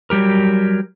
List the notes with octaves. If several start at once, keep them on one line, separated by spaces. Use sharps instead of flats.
F#3 G3 G4 A#4